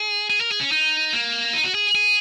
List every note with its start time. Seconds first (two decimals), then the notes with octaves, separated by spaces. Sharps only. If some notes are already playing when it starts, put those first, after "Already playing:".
Already playing: G#4
0.30 G#4
0.40 A#4
0.51 G#4
0.61 C#4
0.72 D#4
1.13 A#3
1.53 D#4
1.64 F#4
1.75 G#4
1.95 G#4